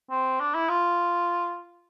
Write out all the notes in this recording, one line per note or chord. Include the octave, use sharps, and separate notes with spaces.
C4
D4
E4
F4